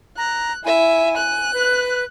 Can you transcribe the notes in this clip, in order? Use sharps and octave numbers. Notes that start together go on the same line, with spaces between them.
A#5 F#6
E4 E5 G#5
F#6
B4